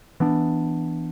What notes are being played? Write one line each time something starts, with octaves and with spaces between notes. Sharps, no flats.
E3 B3 D4